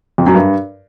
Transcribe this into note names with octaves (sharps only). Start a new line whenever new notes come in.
F2
F#2
G2